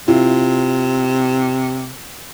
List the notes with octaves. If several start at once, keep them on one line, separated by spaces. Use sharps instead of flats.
C3 E4 F4